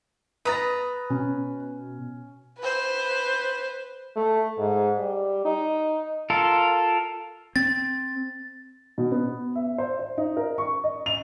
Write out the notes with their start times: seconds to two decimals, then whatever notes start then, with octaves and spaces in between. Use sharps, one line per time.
0.45 B4 A#5 D#6 A6
1.10 B2 C#4
2.59 B4 C5
4.16 A3
4.58 G#2
4.97 G3
5.45 D#4
6.30 F4 A4 A#4
7.56 C4 A6
8.98 B2
9.12 B3
9.56 E5
9.78 C5
9.99 C5
10.18 D#4
10.37 A#4
10.58 C#6
10.84 D#5
11.06 F7